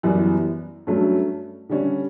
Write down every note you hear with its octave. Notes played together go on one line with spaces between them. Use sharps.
F#2 E3 G3 B3
G2 F#3 A3 C#4
D3 G3 C#4